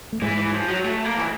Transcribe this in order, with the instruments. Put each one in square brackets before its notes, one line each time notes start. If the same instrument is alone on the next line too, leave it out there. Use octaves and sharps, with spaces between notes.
[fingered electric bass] A3
[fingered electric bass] G#2 G#3 [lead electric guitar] E3
[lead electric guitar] E3
F3
F#3
A3
A#3
E3